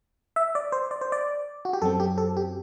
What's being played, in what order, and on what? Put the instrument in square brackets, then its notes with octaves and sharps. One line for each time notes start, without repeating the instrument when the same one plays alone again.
[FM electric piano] E5
D5
C5
D5
C5
D5
F#4
G4
F#2 F#3 C4 A4
G4
A4
G4